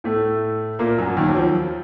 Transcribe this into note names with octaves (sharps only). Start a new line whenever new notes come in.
A2 A3
A#2 A#3
F#2 F#3
D#2 D#3
F#3
F3